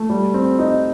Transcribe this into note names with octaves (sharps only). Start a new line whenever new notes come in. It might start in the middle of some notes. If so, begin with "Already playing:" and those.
Already playing: A3
G3
C4
D#4